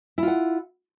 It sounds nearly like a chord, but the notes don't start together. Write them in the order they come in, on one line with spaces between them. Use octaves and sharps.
E4 F4 F#5